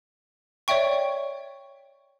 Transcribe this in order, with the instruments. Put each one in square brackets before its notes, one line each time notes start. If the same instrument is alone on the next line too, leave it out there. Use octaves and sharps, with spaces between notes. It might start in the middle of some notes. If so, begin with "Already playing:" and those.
[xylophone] C#5 D5 E5 G5 C#6